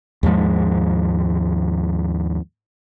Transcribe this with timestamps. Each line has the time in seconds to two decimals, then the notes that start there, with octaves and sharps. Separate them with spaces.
0.23 D#2 G#2 F3 G#3